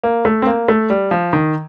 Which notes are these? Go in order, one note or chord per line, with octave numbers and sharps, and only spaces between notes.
A#3
A3
C4
A#3
A3
G3
F3
D#3